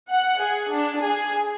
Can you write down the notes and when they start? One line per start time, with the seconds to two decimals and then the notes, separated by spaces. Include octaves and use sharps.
0.10 F#5
0.40 G#4
0.70 D4
1.00 G#4